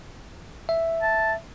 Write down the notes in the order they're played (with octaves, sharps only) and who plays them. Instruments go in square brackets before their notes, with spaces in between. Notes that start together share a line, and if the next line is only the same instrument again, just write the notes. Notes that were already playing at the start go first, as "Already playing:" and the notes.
[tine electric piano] E5
[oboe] A5